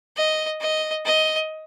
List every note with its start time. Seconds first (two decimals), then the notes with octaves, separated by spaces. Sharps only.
0.16 D#5
0.61 D#5
1.06 D#5